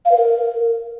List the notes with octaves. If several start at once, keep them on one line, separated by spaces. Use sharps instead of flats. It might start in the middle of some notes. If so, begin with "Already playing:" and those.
F5
B4
A#4